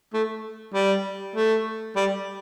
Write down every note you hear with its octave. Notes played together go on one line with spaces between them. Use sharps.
A3
G3
A3
G3